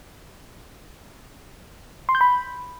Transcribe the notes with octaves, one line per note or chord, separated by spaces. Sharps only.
C6
G6
B5